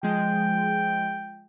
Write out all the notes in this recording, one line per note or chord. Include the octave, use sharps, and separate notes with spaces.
F3 G#3 G5